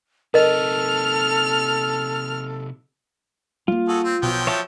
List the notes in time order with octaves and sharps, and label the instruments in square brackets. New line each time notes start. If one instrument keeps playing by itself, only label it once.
[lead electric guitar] C3 D#4 [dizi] A4 [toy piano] A#4 D#5 [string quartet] F6
[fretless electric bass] G3 A#3 [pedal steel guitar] F4
[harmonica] F#4 G#4 A4
C4
[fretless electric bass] B1 B2 [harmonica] F3 F#3 G5
[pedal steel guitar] C#5 E5 A5